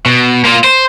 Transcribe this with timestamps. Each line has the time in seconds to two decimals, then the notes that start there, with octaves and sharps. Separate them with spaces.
0.06 B2
0.45 A#3 F4
0.64 C5